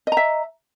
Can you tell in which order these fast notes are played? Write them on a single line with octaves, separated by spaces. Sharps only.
D#5 A#5 E5